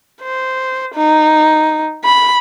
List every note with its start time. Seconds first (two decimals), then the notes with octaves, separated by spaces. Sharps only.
0.22 C5
0.95 D#4
2.04 B5